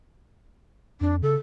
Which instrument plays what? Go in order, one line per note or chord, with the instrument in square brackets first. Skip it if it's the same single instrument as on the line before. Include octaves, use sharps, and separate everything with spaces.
[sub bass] F2 [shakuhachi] D4
[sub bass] C#3 [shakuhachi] A4